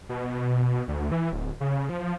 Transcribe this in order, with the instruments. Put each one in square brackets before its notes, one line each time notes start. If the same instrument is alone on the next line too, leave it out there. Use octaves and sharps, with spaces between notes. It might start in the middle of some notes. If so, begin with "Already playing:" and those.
[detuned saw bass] B2
D2
E3
D1
C#3
F3